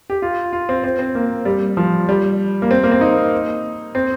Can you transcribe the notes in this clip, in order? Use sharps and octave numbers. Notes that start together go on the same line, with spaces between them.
G4
F4
F4
C4
C4
C4
A#3
G3
F3
G3
A#3
C4
A#3
C4
D#4
C4